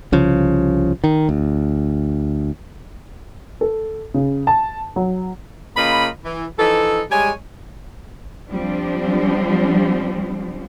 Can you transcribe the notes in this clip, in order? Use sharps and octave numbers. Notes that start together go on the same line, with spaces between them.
C2 C#3 F3
D#3
D2
A4
C#3
A5
F#3
C#3 A#3 F4 D#5 B5
E3
E3 F3 D#4 A4
G3 G#3 C#5 G#5
F3 G3 C4 D4